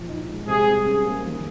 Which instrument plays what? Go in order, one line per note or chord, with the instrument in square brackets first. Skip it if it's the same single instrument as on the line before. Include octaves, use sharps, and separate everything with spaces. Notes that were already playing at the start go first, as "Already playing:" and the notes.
Already playing: [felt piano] A#2 F3
D#4
G#3
[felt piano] C3 [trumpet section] G#4
[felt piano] G3
C#4
A#3
D#3